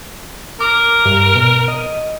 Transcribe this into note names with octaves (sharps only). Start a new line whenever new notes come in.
A#4 D6
G2
B2
D#5